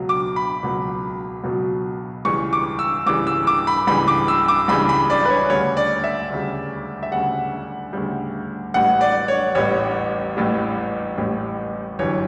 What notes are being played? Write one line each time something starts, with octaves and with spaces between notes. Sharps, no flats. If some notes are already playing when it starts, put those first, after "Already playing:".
Already playing: C#2 B2 F#3
D6
B5
C#2 B2 F#3
C#2 B2 F#3
C#2 C#3 E3 G3 C#6
D6
E6
C#2 C#3 E3 G3 D6
E6
D6
B5
C#2 C#3 E3 G3 B5
D6
E6
D6
C#2 C#3 E3 G3 B5
B5
D5
B4
C#5
D2 C#3 G3 C#5
D5
E5
D2 C#3 G3
E5
D2 C#3 G3 F#5
D2 C#3 G3
A1 A2 G3 F#5
D5
C#5
A1 A2 G3 C#5
A1 A2 G3
A1 A2 G3
G1 F#2 E3 G3 C#5